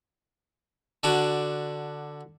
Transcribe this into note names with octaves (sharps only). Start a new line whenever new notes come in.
D3 D4 F#4